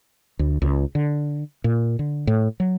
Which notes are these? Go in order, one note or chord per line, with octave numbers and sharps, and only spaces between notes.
D2
C#2
D3
A#2
D3
A2
F#3